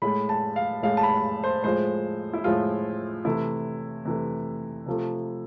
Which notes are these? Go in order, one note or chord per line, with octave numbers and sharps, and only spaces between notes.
A2 G#3 B5
A5
F5
A2 G#3 F5
A5
B5
C5
A2 F3 G#3 C5
E4
A2 F3 G#3 F4
C3 E3 A3 E4
C3 E3 A3
C3 F3 A3